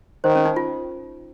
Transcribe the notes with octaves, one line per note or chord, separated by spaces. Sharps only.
D#3 C5
C#4
D#4
F4